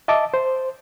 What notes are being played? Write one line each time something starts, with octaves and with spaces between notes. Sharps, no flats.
D#5 E5 A5 D6
C5